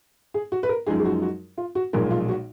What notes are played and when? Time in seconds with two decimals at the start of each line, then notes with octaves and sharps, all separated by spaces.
0.34 G#4
0.52 F#4
0.63 B4
0.69 A#4
0.87 F#2 F3 G#3 D#4 G#4
0.99 G#4
1.05 F#4
1.22 F#4
1.58 F4
1.75 F#4
1.93 B1 A#2 F3 G#3 A#4
2.11 F4
2.28 F#4